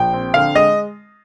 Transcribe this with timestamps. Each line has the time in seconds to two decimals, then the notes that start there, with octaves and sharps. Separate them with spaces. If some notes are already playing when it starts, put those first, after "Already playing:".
Already playing: A#1 G5
0.14 C4
0.34 D3 F5
0.55 G#3 D#5